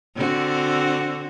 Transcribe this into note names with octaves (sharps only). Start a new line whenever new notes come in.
D3 C4 F#4